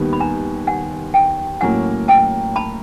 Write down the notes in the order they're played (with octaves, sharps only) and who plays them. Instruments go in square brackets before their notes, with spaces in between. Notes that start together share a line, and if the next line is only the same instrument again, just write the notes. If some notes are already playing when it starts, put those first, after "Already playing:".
Already playing: [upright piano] D#2 D#3 G3 B3
[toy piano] B5
G#5 A#5
F#5 G#5
G5 A5
[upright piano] A2 F#3 A#3 C#4 [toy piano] F#5 G#5
[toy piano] G5 A5
A5 B5